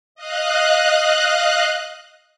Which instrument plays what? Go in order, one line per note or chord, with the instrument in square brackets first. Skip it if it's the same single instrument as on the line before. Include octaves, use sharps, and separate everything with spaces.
[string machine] D#5 F5 F#6